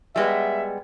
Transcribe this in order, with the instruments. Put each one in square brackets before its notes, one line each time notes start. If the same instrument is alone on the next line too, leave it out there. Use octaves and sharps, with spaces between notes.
[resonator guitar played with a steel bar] G3 G#3 B3 [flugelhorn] E5